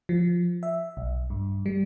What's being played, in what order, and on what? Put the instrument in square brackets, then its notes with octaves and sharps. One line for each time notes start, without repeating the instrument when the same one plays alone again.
[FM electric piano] F3
E5
B1
G2
G3